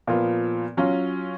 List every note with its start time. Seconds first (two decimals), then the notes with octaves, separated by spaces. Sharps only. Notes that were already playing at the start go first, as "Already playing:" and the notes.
0.07 A#2 F3 B3 F4
0.77 F#3 C#4 F4